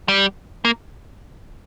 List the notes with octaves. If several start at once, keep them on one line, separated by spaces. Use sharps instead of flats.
G3
A#3